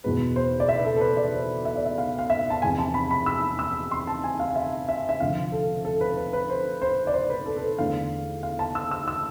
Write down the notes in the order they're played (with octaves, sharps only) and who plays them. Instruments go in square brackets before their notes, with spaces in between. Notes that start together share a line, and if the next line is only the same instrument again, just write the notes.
[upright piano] E2 B2 G#3 B4
C5
D5
E5
B4
A4
A4
B4
D5
C5
E5
D5
E5
F5
F5
E5
A5
F1 E2 C3 G#5
A5
B5
B5
E6
E6
C6
A5
G#5
F5
F5
E5
E5
E5
F1 F2 D3 F5
A4
A4
B4
B4
B4
C5
C5
D5
C5
B4
A4
A4
B4
E2 D3 A3 F5
F5
A5
E6
E6
E6